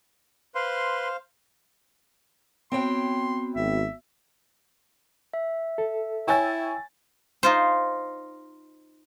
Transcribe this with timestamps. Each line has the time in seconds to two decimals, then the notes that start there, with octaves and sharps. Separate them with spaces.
0.55 B4 C5 F5 C6
2.72 B3 C4 F#4 C#5 G5 C6
3.56 G#1 E5
5.34 E5
5.78 A4
6.28 E4 C#5 G5 G#5 E6 A6
7.43 D#4 F4 C5